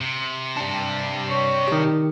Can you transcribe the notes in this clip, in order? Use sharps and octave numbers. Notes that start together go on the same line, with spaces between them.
C3
G3 D4
C#5
D#3 G4